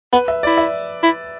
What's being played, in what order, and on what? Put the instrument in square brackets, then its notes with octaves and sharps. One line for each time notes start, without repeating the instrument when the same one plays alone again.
[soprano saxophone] B3 [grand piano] B4
[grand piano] E5
[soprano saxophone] E4 [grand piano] D5
[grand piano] E5
[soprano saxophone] E4